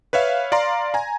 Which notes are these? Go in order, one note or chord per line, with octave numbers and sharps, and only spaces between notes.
B4 C#5 E5 F5
D5 F5 A#5 C6
G#5 A#5